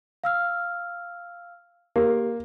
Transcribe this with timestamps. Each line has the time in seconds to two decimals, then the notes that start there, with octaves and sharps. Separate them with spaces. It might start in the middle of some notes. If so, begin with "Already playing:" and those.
0.24 F5 E6 F6
1.96 A#3 G4